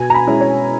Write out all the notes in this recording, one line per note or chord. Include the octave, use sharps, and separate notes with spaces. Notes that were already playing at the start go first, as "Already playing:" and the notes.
Already playing: B2 G#5
A#5
B5
G#3 C#4 E4
C#5